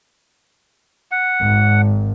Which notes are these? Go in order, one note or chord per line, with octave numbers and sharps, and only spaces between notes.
F#5
G#1